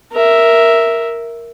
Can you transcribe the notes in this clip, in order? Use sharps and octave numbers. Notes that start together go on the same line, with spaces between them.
A#4 E5